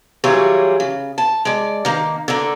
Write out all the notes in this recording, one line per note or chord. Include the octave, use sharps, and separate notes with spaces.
E3 F#3 G3 F4 G#4 C#5
C#3
A5
G#3 D5
D#3 A#3
D3 A#3